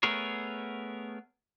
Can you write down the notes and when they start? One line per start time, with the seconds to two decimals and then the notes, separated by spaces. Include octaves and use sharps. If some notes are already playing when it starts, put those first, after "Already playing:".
0.03 A3 B3 G#4 A#4 C#5